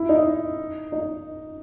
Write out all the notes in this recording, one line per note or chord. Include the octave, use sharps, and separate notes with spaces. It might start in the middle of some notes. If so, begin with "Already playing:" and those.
Already playing: E4
D#4
D#4